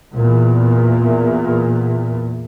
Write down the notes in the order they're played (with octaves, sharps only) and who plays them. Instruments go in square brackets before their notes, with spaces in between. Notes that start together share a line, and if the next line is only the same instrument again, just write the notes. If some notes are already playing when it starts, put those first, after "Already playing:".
[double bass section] E2 A#2